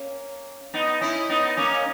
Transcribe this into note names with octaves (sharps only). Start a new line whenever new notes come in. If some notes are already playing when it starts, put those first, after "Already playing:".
Already playing: A#3 C#4
B3 D#4
C#4 E4
B3 D#4
A#3 C#4